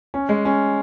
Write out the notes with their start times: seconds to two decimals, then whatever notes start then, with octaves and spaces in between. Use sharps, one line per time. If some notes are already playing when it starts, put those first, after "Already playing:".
0.14 C#4
0.29 G#3
0.45 C#4